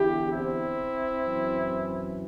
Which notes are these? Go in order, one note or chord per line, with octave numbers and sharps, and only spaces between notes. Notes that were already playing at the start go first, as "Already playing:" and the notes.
Already playing: E2 D3 E4 G4
C4 E4
F#2 E3